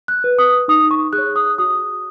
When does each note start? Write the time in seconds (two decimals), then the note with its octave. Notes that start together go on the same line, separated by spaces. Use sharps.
0.08 F#6
0.24 B4
0.39 D#6
0.68 D#4 D#6
0.91 C#6
1.13 G#4 F#6
1.18 C#5
1.36 D#6
1.58 F#4 D#6